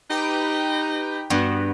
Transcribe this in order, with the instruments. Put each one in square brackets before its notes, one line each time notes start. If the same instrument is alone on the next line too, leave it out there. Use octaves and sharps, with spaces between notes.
[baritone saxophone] D#4 [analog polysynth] G4 B4 G5
[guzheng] G2 [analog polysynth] B3 F#4